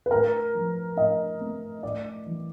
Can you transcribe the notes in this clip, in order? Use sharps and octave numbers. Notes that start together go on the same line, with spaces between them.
B4
A2 A#4
F3
A2 D#5
A3
A2 D5
E3